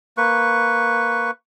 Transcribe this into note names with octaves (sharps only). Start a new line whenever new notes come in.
A#3 B4 C#6